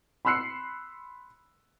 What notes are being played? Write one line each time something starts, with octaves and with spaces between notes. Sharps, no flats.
B5 C6 E6 F#6 C7 C#7